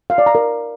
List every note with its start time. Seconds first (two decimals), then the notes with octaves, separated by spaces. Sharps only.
0.10 F5
0.18 D5
0.26 A#5
0.35 A#4